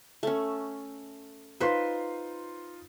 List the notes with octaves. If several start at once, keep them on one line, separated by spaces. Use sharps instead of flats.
A3 C#4
D#4 F4 B4 C5 C6